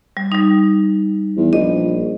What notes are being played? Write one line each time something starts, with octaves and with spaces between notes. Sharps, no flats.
G3
G3 D#4
E2
A#1 D#5